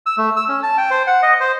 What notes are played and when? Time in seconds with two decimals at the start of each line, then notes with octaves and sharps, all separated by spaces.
0.06 E6
0.18 A3
0.36 E6
0.48 C#4
0.63 A5
0.77 G5
0.91 C5
1.07 F#5
1.23 D#5
1.40 C5